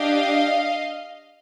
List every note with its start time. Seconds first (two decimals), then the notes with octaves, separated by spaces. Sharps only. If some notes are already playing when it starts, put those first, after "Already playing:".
Already playing: D4 G4 D#5 F5